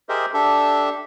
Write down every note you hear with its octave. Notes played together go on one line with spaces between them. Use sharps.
G4 G#4 A#4 C5 D#5 E5
D4 G4 A4 E5